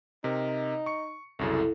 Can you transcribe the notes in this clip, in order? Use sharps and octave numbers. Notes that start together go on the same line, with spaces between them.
C3 D#4 A#4
C#6 C#7
C2 F#2 C#3 E4 A4